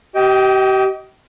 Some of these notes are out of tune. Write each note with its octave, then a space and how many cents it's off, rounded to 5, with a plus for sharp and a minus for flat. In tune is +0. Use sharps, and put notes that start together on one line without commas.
G4 -35 D#5 +20 G5 +0